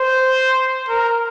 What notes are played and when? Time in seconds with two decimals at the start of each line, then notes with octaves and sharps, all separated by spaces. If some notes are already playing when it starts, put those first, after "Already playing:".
Already playing: C5
0.89 A#4